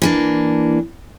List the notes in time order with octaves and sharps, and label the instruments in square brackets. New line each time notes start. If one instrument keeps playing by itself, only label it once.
[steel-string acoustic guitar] E3 A#3 D4